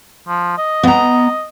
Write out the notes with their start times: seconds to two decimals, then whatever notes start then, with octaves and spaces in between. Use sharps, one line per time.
0.28 F3
0.58 D#5
0.83 B3 A#5